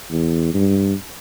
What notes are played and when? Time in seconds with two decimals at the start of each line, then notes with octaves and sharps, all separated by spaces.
0.11 E2
0.54 G2